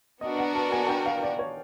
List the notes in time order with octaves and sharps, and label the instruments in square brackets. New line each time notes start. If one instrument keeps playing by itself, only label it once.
[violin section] B3 D4 F#4 A#4 [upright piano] D#5
[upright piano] F#5
A5
G#5
G5
F5
D5
C#5